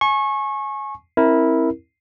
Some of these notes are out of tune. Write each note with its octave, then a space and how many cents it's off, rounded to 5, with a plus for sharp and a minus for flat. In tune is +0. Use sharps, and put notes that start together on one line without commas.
G#5 +25 C#6 -25
C4 +30 E4 -10 A#4 +0